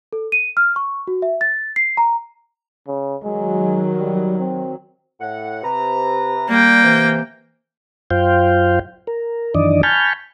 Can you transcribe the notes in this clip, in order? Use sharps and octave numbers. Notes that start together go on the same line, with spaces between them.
A4
D#7
F6
C#6
F#4
E5
A6
C7
A#5
C#3
D#3 F#3 G#3
G3
C4
A2 F#5
C3 B4 A#5
G3 A#3 G5
C3 E3
F#2 F4 C5 F5 G5
A#4
F#2 D#3 E3 D4 D5 D#5
G#5 A5 B5 C#6 F6 G6